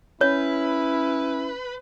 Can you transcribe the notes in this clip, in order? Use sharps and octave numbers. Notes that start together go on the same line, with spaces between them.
C#4 E4 B4 C#5